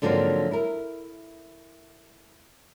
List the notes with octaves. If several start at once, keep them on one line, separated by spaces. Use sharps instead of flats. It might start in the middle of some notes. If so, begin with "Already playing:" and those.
G#2 D3 F3 F#3 A#3 C4
E4 A#4